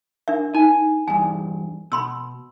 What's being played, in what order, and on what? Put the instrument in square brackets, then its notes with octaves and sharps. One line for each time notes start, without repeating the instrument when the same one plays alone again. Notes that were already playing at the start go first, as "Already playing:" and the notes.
[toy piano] D4 A#4 E5
[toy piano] D#4 [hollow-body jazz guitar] G#5
[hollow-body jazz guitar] E2 G2 [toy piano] G#5
[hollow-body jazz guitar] B2 [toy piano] B5 C6 E6